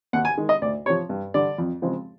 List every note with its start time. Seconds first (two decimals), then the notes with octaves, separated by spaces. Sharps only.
0.13 D#2 F#5
0.25 G#5
0.37 D#3 G#3
0.49 D#5
0.62 D2 D5
0.86 C3 C#5
0.90 F3
1.09 G2
1.34 D3 G3 D5
1.58 F2
1.82 C#3 F3 G#3 C4